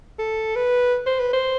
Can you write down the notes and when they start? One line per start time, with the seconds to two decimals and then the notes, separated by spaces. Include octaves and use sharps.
0.19 A4
0.56 B4
1.06 C5
1.20 B4
1.33 C5